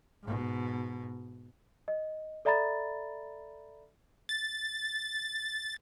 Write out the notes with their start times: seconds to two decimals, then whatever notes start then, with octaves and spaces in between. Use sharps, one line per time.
0.23 G#2 B2
1.88 D#5
2.45 A4 D5 E5 A#5 B5 A6
4.29 A6